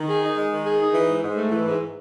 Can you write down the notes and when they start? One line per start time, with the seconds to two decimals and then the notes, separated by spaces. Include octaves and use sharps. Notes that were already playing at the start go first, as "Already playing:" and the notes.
Already playing: D#3
0.09 G#4
0.22 D#4
0.37 G#3
0.50 D#3
0.66 G#4
0.80 D#4
0.93 E3
1.08 G#2
1.23 G#2
1.37 A3
1.51 E3
1.66 G#2